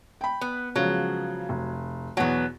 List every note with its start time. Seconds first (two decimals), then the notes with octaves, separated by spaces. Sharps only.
0.21 G5 B5
0.41 B3
0.76 C#3 F3 F#3 G#3
1.49 F1
2.17 E2 B2 F#3 B3 F#5